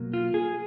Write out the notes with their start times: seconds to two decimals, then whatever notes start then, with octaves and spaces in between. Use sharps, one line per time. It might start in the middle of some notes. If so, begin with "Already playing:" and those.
Already playing: B2 F#3 A#3
0.13 F4
0.34 G#4